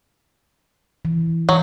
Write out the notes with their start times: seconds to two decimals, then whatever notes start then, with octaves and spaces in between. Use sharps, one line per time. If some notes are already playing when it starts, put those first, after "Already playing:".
1.05 E3
1.49 E3 F#3